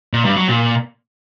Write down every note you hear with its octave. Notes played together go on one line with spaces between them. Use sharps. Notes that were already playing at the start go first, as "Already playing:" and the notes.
A#2
G2
F#3
A#2